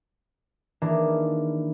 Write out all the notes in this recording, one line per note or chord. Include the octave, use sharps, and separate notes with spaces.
D#3 E3 A#3 D4 G#4 A#4